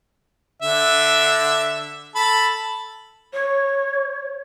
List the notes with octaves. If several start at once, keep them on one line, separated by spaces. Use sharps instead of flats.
D3 E5
A4 B5
C#5